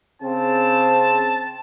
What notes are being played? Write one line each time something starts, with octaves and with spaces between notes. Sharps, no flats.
C#3 C4 A5